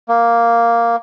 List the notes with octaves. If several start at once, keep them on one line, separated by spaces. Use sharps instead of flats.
A#3